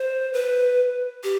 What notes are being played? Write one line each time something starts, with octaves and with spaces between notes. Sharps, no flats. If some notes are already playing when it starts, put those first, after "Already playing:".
Already playing: C5
B4
G4